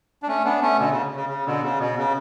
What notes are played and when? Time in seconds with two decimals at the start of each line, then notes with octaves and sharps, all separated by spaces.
0.23 D4
0.28 A3 C#4
0.45 B3 D4
0.62 A3 C#4
0.79 B2 D3
0.91 C#3
1.16 C#3
1.29 C#3
1.46 B2 D3
1.64 C#3
1.80 B2
1.97 C#3